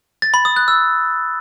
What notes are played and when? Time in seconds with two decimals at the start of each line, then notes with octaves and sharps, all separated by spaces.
0.22 A6
0.34 B5
0.45 D#6
0.56 F#6
0.68 E6